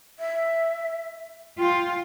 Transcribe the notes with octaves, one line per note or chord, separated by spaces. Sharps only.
E5
F4 G5